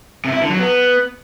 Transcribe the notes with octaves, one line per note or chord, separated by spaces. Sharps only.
C3
E4
D3
F#3
B3